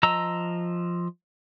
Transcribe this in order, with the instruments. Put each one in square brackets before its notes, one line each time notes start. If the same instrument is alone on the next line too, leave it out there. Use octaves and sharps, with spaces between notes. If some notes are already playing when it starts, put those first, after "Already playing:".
[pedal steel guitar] F3 D#5 A#5 E6